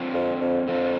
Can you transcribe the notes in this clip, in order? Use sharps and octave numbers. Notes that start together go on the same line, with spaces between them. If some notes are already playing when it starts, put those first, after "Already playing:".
Already playing: D3 F3 C4
F2
F2
F2 D3 F3 C4